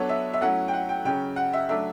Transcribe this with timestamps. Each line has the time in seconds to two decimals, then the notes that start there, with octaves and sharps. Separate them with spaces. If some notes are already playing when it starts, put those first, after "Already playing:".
Already playing: F#3 B3 D4 A4 C#5
0.09 E5
0.33 E5
0.41 F#3 A3 C#4 E4 F#5
0.68 G5
0.73 F#5
0.89 G5
1.05 C#3 F#3 C#4 G5
1.36 F#5
1.53 E5
1.69 F#3 A3 D4 E5